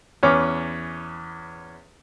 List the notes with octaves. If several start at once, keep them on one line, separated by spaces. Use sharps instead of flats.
E2 C#4 B4 C#5 D6 F6